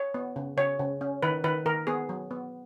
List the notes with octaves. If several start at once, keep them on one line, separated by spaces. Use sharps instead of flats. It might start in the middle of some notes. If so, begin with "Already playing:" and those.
Already playing: C#5
B3
C#3
C#3 C#5
C#3
C#4
D#3 B4
D#3 B4
D#3 A#4
B3 G#4
F#3
B3